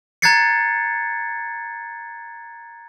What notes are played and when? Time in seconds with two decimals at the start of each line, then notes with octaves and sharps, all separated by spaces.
0.22 A#5 F#6 G#6 A6 C7 C#7